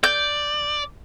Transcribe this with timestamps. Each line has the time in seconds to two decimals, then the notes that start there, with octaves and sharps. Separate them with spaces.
0.04 D5 G6